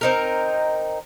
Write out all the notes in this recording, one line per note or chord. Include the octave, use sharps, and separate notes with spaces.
C4 D#4 A#4